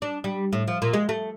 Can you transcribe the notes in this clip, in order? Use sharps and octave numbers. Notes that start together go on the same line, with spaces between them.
D4
G3
A2
F3
A#2
G#3
A3